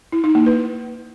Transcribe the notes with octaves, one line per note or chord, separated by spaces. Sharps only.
E4
D#4
A#3
B4